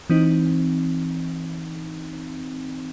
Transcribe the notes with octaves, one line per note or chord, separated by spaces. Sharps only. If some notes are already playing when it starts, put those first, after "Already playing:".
E3 C4 D#4